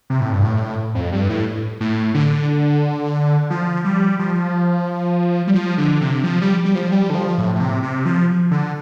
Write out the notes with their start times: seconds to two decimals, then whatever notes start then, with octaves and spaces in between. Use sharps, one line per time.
0.10 C3
0.21 A2
0.32 G2
0.43 A2
0.95 F2
1.12 G2
1.29 A2
1.80 A2
2.14 D3
3.50 F3
3.84 G3
4.19 F3
5.47 G3
5.55 F3
5.78 D3
6.01 C3
6.24 F3
6.41 G3
6.65 G3
6.75 F3
6.92 G3
7.10 D3
7.15 F3
7.38 A2
7.55 A2
7.60 C3
7.83 C3
8.05 F3
8.51 D3